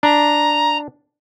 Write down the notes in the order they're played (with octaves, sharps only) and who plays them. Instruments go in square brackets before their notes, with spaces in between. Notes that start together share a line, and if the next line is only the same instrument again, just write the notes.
[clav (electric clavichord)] D4 [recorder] A#5